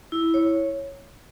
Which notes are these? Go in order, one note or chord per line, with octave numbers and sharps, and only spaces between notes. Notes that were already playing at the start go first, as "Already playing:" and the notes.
E4
C#5